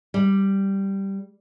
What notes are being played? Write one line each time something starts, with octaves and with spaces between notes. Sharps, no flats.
G3